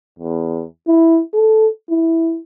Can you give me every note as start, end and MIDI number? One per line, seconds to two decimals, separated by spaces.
0.19 0.64 40
0.87 1.20 64
1.33 1.67 69
1.89 2.39 64